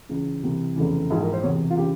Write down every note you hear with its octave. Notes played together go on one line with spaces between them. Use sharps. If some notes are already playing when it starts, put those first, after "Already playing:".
C#2 C#3 E3
C2 C3 E3
F1 E2 C#3 E3
A#1 G#2 E3 G#4
A#4
C5
E1 E2 C3 C#5
F4
C#3 E3 G4